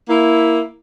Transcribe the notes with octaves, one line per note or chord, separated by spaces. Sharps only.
A#3 E4